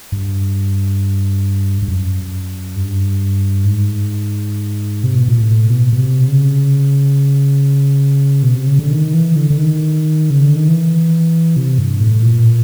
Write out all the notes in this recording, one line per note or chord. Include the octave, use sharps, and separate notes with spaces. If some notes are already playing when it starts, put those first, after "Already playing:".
G2
G2
F#2
G2
G#2
C3
B2
A#2
A2
B2
B2
C3
C#3
B2
C3
C#3
D3
D#3
E3
D3
D3
D#3
C#3
D3
D#3
E3
C3
G2
A2
A#2